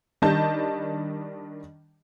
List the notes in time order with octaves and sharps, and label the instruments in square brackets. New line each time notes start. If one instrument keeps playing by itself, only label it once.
[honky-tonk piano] D#3 G3 D4 D#5 A5 G6